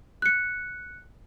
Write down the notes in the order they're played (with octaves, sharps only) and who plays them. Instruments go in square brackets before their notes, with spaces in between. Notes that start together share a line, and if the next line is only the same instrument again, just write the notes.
[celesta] F#6 C#7